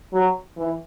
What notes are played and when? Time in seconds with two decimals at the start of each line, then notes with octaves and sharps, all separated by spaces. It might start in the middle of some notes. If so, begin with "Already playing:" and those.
0.13 F#3
0.56 E3